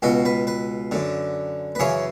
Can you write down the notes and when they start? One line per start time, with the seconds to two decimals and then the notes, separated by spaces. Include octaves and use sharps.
0.02 C#2 B2 F#4
0.25 B4
0.47 B4
0.92 F#2 D3
1.75 B4
1.79 F#2 C#3 E3 C#5